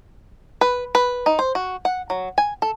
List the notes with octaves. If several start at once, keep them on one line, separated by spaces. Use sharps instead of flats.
B4
B4
D#4
C5
F#4
F#5
F#3
G#5
A4